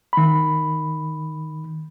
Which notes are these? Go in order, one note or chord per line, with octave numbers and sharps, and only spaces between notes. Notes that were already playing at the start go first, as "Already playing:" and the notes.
D#3 B5